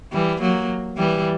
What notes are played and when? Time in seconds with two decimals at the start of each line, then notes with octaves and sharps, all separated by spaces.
0.12 E3 G3
0.40 F#3 A#3
0.97 E3 G3